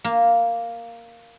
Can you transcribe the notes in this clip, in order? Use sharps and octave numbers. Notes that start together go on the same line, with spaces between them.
A#3